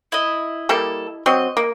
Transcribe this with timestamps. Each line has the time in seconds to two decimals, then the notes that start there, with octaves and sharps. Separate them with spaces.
0.12 E4 D#5
0.69 G3 A#3 A4
1.26 F#3 C4 D#5
1.57 A#3